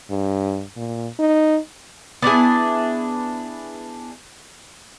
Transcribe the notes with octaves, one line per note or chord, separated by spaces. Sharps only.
G2
A#2
D#4
B3 D4 E4 G#4